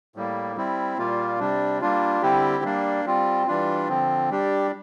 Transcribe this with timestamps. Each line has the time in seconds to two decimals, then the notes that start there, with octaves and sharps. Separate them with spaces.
0.16 A2 G3 A#3
0.56 G3 C4 E4
0.98 A#2 G3 A#3 F4
1.40 C3 G3 D4
1.81 G3 A#3 D4 F4
2.22 D3 G3 C4 E4 G4
2.64 G3 A#3 D4
3.05 G3 C4 F4
3.47 E3 G3 D4 F4
3.88 D3 F3 C4
4.30 G3 D4 G4